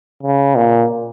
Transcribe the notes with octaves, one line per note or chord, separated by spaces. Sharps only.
C#3
A#2